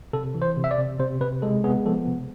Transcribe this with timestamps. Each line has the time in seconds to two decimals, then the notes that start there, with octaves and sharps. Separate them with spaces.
0.13 C3 A4
0.35 E3
0.42 C5
0.57 C3
0.64 E5
0.71 D5
0.78 C3
0.99 C3 C5
1.21 C3 B4
1.42 G#3 A4
1.64 B3 G#4
1.86 F3 A4
2.07 C3